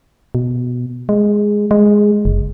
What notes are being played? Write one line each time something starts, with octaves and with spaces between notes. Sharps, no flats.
B2
G#3
G#3
F#1